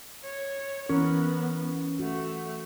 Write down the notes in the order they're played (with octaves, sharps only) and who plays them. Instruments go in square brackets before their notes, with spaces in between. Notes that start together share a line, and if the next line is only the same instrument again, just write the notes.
[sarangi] C#5
[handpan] E3 A#4 [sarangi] B3 [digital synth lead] C#4
[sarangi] A3 [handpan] F#4